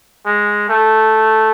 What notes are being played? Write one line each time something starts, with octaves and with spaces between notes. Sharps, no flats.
G#3
A3